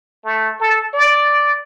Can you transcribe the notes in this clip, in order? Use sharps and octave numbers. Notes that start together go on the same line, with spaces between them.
A3
A4
D5